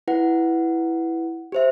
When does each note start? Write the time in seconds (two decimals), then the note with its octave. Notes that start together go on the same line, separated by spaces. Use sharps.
0.08 E4 B4 F#5
1.52 G4 C5 E5